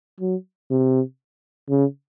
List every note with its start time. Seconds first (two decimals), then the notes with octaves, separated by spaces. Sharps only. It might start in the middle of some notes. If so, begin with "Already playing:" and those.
0.20 F#3
0.71 C3
1.70 C#3